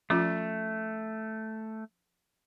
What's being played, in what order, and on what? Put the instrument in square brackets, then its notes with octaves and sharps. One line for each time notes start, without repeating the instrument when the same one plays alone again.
[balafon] F3 C#4 F4 [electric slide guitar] A3